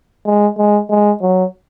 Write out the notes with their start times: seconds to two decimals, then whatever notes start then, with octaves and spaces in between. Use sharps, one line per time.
0.26 G#3
0.58 G#3
0.90 G#3
1.22 F#3